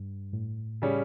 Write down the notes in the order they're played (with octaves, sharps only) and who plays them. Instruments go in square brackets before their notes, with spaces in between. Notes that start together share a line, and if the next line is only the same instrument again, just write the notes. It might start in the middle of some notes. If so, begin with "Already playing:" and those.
Already playing: [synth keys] G2
A2
[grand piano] C#3 G3 C#4